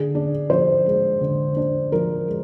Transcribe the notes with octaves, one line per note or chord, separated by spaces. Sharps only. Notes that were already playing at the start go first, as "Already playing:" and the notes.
Already playing: D3 G#4
D4
F3 C5
G#3
D3
D4
F3 A#4
G#3